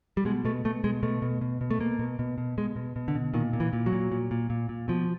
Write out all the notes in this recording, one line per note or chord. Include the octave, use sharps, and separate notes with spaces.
G3
B2 G#3
B2 A3
B2 A3
B2 G#3
B2 A3
B2
B2
B2
A3
B2 A#3
B2
B2
B2
B2 G#3
B2
B2
D3
B2
A#2 D#3
A#2
E3
A#2
F#3
A#2
A#2
A#2
A#2
A#2
B2 F3